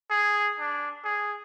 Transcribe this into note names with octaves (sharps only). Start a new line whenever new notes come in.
G#4
D4
G#4